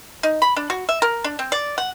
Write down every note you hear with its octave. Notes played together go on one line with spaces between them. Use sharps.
D#4
B5
D4
F#4
E5
A#4
D4
C4
D5
F#5